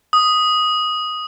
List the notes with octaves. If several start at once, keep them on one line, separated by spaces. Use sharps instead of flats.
D#6